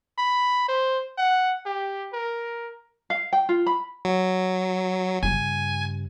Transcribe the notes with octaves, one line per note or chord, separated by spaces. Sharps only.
B5
C5
F#5
G4
A#4
F5
G5
F4
B5
F#3
G2 C#3 G#5